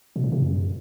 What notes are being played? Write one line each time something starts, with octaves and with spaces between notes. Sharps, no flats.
B2
A#2
C3
F#2